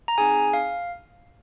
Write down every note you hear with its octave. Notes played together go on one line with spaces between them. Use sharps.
A#5
C4 D#4 G#4 G#5
F5